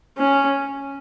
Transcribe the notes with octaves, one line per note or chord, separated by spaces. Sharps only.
C#4